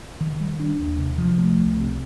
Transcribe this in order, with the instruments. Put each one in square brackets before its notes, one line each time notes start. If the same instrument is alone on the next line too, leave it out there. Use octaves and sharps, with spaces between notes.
[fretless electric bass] D#3
G3
D4
D#2
C3
F3
A3
C2
C3